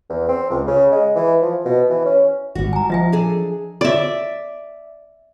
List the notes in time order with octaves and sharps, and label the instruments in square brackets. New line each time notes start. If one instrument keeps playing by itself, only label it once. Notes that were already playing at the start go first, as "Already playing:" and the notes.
[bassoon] E2
C4
C#2
C#3
G#3
E3
F3
B2
E3
C#4
[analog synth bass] G#1 [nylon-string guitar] G3 F#4
[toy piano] G#5 A#5
[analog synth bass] F3 [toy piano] D#5 E5 G#5
[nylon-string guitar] D4 G#4 A4
[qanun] D5 E5